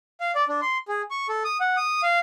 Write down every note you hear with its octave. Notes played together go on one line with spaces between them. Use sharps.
F5
D5
D4
C6
G#4
C#6
A4
D#6
F#5
D#6
F5